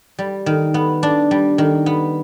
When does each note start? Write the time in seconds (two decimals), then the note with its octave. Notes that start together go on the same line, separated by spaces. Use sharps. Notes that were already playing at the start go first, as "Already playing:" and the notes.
0.19 G3
0.46 D#3
0.74 B3
1.03 D4
1.31 G3
1.58 D#3
1.86 B3